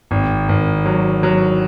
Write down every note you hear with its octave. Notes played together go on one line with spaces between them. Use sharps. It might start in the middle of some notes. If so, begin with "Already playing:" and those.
G#1
G#1
F#3
F#3